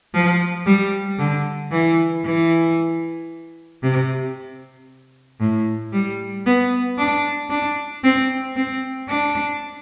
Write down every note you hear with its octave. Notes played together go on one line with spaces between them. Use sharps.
F3
G3
D3
E3
E3
C3
A2
G3
B3
D4
D4
C4
C4
D4